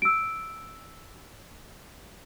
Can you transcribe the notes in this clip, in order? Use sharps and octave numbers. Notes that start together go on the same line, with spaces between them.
E6 D7